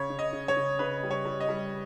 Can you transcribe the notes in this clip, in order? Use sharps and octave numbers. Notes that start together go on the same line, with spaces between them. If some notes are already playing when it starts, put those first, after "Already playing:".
Already playing: C#3 C#5
C#3
D#5
C#3
C#5
C#3
C#3 B4
G3
C#5
G3
D#5
G3